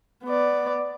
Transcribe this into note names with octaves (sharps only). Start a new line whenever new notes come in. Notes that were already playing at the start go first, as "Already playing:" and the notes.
B3 D5